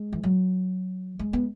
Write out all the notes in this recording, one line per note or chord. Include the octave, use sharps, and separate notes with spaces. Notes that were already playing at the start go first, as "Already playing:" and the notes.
Already playing: G#3
E3
F#3
G#3
B3